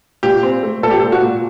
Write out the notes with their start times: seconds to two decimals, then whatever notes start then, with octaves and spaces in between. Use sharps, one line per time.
0.23 A#2 G4
0.43 C4
0.63 A3
0.83 A#2 A4
0.91 G4
1.00 A4
1.03 A#2
1.12 F#4
1.22 A#2